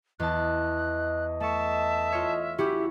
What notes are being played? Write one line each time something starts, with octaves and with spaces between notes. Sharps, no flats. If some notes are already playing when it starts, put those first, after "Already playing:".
E2 D#5 A5 F#6
A3 E5 A5 C#6
F4 C#5
C#4 E4 F#4 G4